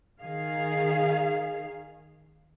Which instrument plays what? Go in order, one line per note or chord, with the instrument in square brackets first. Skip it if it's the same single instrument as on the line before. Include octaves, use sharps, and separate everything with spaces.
[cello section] D#3 G#4 F5